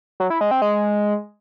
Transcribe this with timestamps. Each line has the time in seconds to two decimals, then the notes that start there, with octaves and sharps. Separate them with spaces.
0.20 F#3
0.30 E4
0.41 G#3
0.51 C4
0.62 G#3